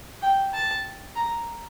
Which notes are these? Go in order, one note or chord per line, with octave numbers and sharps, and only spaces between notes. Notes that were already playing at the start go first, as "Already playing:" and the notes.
G5
A5
A#5